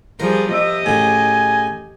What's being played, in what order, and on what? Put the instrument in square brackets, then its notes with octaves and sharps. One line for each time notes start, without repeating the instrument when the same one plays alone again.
[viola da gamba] F3 G3 G#4 [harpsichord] A#4
[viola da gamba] G4 D#5 [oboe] E5
[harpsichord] A2 C#3 [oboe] G#5